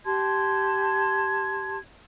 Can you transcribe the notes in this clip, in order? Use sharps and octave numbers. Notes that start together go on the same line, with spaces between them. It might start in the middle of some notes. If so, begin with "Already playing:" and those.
G4 A5 C6 G#6